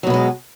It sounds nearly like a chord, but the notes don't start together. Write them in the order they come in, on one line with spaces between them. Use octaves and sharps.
F#3 B2 B3 G#3